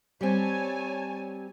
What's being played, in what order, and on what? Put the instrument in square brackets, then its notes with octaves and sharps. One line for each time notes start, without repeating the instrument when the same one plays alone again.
[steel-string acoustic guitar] G3 C4 [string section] C#5 G#5 A5